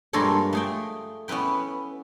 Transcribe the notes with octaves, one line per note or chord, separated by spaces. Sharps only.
G2 G#3 A#3 F4 A4 C#5
A3 G#4 G5
B3 C#4 E4 B4 G5